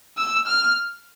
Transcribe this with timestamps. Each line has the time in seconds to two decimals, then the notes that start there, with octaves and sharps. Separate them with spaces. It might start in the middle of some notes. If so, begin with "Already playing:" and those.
0.17 E6
0.47 F6